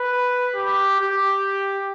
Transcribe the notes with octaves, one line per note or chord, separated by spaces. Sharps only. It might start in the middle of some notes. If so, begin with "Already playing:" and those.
Already playing: B4
G4
G4